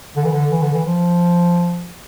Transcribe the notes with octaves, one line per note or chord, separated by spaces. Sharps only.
D3
E3
D3
E3
D3
E3
F3